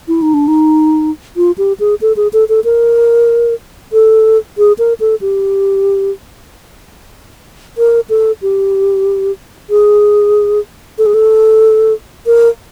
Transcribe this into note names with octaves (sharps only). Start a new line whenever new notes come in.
E4
D#4
D4
D#4
F4
G4
G#4
A4
G#4
A4
A4
A#4
A4
G#4
A#4
A4
G4
A#4
A4
G4
G#4
A4
G#4
A4
A#4